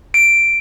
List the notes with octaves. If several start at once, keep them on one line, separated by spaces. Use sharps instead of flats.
D7